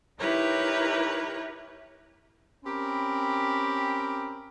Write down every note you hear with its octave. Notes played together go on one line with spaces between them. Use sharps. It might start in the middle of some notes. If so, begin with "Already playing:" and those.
D#4 E4 G4 A#4 B4 C#5
C4 C#4 G4 A#4 B5